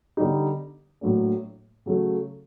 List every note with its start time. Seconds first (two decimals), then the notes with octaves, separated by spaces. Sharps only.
0.17 D3 G3 B3 D#4 G4
1.01 A2 F#3 A#3 D4
1.86 C#3 F#3 A3